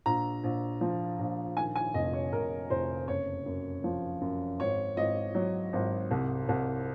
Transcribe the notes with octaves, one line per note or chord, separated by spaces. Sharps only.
A#1 A#5
A#1
F3
A#1
D#3 G#5
G#5
F1 D#5
C#5
F1 A#4
F1 C5
F#1 C#5
F#2
F3
F#2
G#1 C#5
G#1 D#5
F#3
G#1
C2
C2